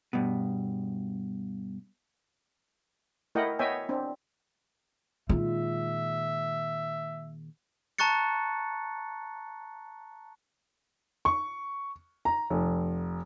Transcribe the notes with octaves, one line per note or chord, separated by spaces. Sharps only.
G2 B2
A3 E4 A#4 D#5 F#5 G5
B3 C#5 D#5 E5 G5 G#5
C4 D4
A#2 D#3 G#3 F4 E5
A5 A#5 C#6 F#6 A6 C#7
C#6
A#5
F1